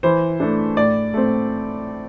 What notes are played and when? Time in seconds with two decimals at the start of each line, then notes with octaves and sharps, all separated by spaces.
0.03 E3 C5
0.40 A3 D4
0.77 A2 D5
1.14 A3 C4